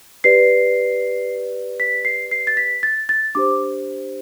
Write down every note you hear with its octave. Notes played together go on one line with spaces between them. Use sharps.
G4 B4 D5 C7
B6
C7
C7
A6
B6
A6
A6
D4 G4 C5 D6